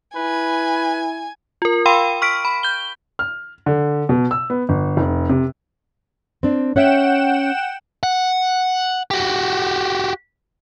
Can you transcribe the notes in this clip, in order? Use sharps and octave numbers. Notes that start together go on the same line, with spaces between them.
E4 B4 G#5
F4 A#4
F5 G5 B5 C6 E6 D#7
C#6 F6 B6 D7
B5
G6 G7
F6
D3
B2
E6
B3
G1
F1
C3
C4 D4
C#4 C#5 E5 F#5 G5 E7
F#5
F#4 G4